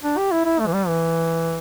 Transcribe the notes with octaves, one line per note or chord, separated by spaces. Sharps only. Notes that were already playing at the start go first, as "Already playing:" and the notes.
D4
G4
E4
E4
A3
E3
G3
E3